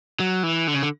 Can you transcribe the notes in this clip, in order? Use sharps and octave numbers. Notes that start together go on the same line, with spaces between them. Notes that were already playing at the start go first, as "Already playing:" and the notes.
F#3
E3
D3
C#3
D3